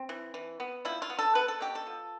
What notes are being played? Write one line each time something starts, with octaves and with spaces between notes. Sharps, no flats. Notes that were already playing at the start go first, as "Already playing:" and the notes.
Already playing: C4
E3
E3
B3
F3 E4
F4
B3
A4
B3 B4
A4
B2 G4
A4
F3